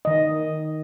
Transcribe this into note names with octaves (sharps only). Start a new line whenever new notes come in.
D#3 D#5